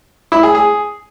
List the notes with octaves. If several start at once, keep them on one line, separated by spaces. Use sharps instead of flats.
E4
G#4
G#4